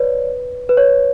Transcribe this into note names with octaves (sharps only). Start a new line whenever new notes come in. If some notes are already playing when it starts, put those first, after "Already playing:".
Already playing: B4 C#5 D5
B4
C#5